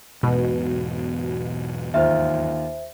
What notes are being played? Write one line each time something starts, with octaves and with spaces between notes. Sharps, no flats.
E2 G#2 B2
D#2 D#3 F4 C5 E5